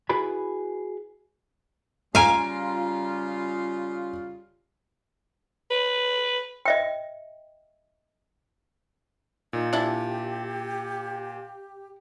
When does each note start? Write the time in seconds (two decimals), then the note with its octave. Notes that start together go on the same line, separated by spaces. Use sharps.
0.09 E4 F#4 G#4 B4 B5
2.15 C#3 G3 F4 F5 G#5 A#5 D7
5.71 B4
6.65 D#5 E5 G5
9.53 A#2 D#4
9.73 D4 E4 G4